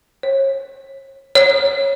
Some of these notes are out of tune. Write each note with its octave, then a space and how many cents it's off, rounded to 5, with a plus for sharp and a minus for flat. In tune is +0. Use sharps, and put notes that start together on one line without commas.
C#5 -40
C#5 -10